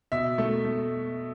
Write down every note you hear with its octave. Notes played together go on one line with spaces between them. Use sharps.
B2 E5
A3
A3